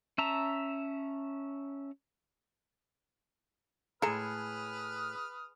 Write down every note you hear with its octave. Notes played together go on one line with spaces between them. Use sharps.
C#4 E5 A5 A#5
A2 G#3 G#4 A4 B4 A#5 D#6 F6